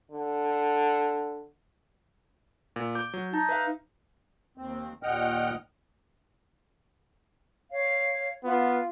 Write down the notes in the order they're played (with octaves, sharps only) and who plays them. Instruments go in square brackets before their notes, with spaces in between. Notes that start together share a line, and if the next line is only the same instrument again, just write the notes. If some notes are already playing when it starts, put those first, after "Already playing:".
[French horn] D3
[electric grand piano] A#2
D6 G6
F#3
[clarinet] D#4 [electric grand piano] A5
[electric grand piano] B4 E5 F5
[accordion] D#2 C4
D#2 A#2 D#5 F#5 G5 F6
[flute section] C#5 F5
[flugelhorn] B3 [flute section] F4